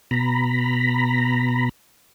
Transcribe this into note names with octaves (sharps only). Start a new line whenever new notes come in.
B2 A#5 B5